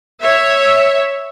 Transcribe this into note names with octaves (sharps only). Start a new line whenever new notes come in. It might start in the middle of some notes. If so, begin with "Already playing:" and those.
C#5 E5